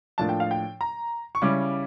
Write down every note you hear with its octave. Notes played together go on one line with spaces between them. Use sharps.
A2 F3 A#3 D4 A5
G5
F5
G5
A#5
C#6
C#3 G3 C#4 E4 D6